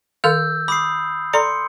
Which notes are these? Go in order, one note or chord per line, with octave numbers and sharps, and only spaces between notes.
D#3 A4 F5 E6 F6 G6
B5 D6 D#6 C7
A4 D5 A#5 C6 C#7